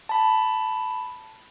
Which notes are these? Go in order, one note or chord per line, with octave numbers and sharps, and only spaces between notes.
A5 B5